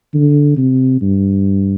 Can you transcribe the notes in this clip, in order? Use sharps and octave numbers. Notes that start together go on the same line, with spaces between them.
D3
C3
G2